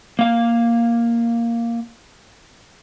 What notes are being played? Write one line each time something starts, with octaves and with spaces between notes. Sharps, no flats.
A#3 F5